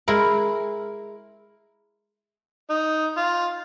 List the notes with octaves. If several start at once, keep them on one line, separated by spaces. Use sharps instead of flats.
G#3 E4 A#4
D#4
F4